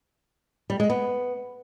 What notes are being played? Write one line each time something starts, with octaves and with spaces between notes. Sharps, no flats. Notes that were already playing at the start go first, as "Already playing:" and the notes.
G3
G#3
B3